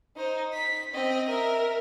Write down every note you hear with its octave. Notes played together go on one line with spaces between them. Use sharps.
D#4 C5
B6
C4 D#5
A#4 E5